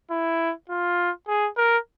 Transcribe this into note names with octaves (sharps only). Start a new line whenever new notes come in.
E4
F4
G#4
A#4